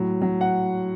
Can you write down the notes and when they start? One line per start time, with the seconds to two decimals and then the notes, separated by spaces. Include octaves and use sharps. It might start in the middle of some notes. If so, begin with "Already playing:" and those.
Already playing: A2 F#3
0.22 F#3
0.41 F#5